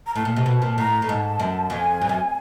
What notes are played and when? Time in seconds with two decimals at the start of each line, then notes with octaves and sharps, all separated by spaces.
0.07 A#5
0.15 A2 A5
0.25 A#2
0.36 C3
0.46 B2
0.62 A#2
0.78 A2 A#5
1.02 A2
1.08 G#2 A5
1.40 F#2
1.70 F2 G#5
2.01 G2
2.09 F#2